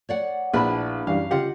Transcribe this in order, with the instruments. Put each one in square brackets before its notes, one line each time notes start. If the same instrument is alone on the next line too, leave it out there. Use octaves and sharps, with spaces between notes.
[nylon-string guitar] C#5 D5 F#5
[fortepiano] A#1 B5 [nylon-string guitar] D4 E4 B4
[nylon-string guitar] F#2 [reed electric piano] E3 G3 D4 [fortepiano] F5
[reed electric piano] C#3 F4 G4 [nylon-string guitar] D#5 F#5